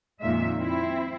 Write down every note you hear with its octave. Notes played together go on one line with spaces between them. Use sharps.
F2 A#2 D#3 G#3 E5
C4 E4